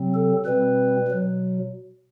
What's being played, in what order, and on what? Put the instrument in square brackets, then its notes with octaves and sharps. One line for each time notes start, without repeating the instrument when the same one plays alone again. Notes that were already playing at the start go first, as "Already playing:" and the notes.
Already playing: [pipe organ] C3 F#3 C4
A4
B2 G3 C4 B4
B2 F#3